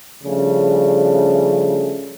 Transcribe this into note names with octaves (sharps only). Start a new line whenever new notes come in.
C#3 F3 G3 A3 D4